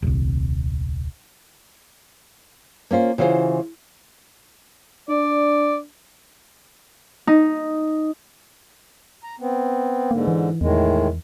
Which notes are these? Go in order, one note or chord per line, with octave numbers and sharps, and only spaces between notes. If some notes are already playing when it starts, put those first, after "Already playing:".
D#1 C2
A#3 C#4 F4 C5
C#3 E3 F4 F#4 C5
D4 D5
D#4
A#5
B3 C4
G#2 D3 A#3
E3
E2 A2 D#3 G#3